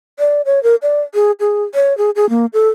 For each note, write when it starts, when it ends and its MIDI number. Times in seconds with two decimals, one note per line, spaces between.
0.19 0.42 74
0.46 0.62 73
0.63 0.75 70
0.82 1.02 74
1.14 1.31 68
1.40 1.64 68
1.75 1.96 73
1.98 2.11 68
2.16 2.29 68
2.30 2.46 58
2.53 2.69 69